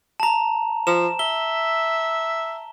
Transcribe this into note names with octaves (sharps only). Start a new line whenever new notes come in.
A5 A#5
F3 E7
E5 G7